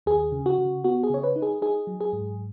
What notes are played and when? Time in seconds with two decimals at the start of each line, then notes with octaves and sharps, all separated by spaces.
0.06 D#2 G#4
0.32 C#3
0.46 F#4
0.58 C#3
0.84 B3 F#4
1.03 G#4
1.10 C#3 C#5
1.23 B4
1.36 D#4
1.42 G#4
1.62 D#4 G#4
1.87 F#3
2.01 G#4
2.13 G#2